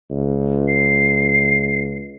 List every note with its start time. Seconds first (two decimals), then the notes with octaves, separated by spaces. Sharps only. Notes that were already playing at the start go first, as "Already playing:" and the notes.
0.10 C#2
0.68 C7